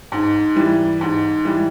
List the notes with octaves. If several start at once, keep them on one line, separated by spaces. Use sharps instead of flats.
G#2
E3 G3
G#2
E3 G3